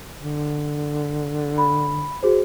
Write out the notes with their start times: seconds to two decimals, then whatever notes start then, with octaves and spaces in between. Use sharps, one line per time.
0.23 D3
1.58 B5
2.23 F#4 G#4 C5